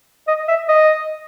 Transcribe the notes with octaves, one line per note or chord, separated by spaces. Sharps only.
D#5
E5
D#5